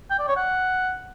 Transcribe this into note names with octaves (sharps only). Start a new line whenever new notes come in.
G5
D5
C#5
F#5